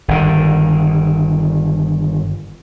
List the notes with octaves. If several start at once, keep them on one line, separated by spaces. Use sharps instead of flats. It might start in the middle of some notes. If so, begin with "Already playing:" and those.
G1 D#3